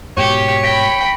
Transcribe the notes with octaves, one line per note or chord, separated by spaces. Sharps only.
G#2 B2 G4 C#5 C#6 C#7
G5 B5 A#6 B6 D7